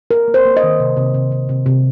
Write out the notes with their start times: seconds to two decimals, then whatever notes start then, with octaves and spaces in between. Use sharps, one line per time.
0.11 A#3 A#4
0.28 A#3
0.34 C5
0.45 A#3
0.57 D#5
0.63 D#3
0.80 C3
0.97 C3
1.14 C3
1.32 C3
1.49 C3
1.66 C3